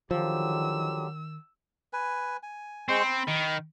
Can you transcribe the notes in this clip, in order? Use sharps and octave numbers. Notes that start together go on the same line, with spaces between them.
D3 D#3 F3 F#3 G4 E6
B4 G#5
G#5
G#3 C4 C5 C#6
B5
D#3